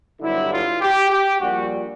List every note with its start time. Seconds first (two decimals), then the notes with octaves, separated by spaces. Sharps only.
0.22 G1 G2 D3 F#3 E4
0.52 F4
0.81 G4
1.10 G4
1.40 A#1 A#2 G3 F#4